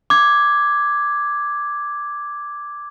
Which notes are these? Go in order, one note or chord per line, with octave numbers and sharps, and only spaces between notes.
D6 G#6